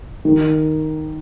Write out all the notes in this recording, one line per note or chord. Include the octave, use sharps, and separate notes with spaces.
D#3